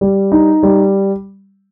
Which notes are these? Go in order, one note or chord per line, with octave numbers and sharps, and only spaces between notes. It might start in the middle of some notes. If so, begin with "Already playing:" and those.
G3
D#4
G3